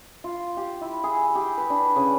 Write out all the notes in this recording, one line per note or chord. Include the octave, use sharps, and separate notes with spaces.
F4
G4
E4
G#4
G4
B4
D4
C#3